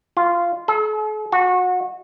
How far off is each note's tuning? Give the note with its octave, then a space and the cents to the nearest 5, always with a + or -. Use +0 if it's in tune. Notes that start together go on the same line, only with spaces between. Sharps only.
F4 -10
A4 -45
F#4 -25